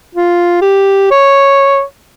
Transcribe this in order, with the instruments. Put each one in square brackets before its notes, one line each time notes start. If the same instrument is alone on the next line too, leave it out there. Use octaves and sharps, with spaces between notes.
[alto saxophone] F4
G4
C#5